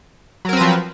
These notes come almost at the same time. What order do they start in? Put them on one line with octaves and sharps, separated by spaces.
F#3 A#4 C4 B4 F3